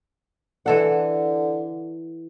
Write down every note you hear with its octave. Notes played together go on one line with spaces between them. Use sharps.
D3 E3 A4 F#5